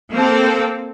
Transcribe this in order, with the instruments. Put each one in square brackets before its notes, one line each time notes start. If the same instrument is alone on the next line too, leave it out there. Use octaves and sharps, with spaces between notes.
[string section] A#3 C4 A4